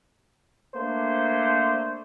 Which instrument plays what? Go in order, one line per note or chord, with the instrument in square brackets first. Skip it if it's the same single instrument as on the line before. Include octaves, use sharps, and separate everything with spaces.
[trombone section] A3 A#3 D4 C5